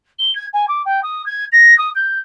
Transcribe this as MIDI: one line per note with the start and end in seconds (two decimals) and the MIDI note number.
0.18 0.34 103
0.35 0.46 92
0.53 0.65 80
0.68 0.82 86
0.85 1.00 79
1.03 1.25 87
1.26 1.45 92
1.52 1.76 94
1.78 1.90 87
1.95 2.18 91